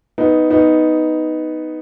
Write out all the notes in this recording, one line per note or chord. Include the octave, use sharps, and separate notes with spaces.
B3 D#4
B3 D#4